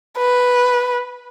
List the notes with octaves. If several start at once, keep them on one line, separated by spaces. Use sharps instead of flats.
B4